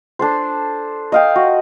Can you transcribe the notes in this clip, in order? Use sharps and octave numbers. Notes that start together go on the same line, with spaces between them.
D4 A4 C5
D#5 F5 G5
F#4